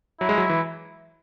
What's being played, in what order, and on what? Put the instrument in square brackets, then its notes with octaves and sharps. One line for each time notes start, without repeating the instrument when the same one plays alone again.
[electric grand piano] F#3 [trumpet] E4
[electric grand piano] G#3
F#3
E3